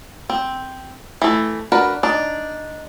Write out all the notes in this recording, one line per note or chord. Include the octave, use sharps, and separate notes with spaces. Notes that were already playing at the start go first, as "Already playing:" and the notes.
C4
E3 A3
D4 F#4 A#4 B4
D4 D#4